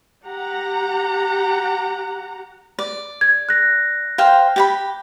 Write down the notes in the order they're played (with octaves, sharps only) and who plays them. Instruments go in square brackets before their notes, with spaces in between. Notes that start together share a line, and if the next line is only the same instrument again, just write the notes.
[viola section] G4 F#5 A#5
[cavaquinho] D5
[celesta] G#6
F#6 A#6
[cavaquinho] C5 F5 G5
G4 G5 B5